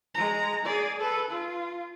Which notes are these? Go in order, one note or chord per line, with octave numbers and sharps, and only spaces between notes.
G#3 A#5
G#4 D5
A4 B4
F4